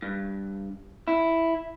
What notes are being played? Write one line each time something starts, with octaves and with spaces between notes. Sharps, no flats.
G2
E4